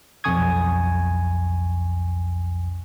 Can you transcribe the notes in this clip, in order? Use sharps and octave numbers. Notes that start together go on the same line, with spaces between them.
B1 F2 G#5 C#6 D#6 G#6